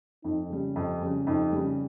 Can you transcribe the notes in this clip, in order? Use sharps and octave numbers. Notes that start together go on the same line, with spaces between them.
F2 D#4
C#3 G3
F2
C#3 G3
F2 D#4
C#3 G3